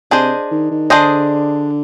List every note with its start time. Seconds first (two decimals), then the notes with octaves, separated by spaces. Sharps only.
0.11 C3 D4 G#4 C5 D#5
0.51 D#3
0.71 D#3
0.90 D3 D4 G#4 C5 D#5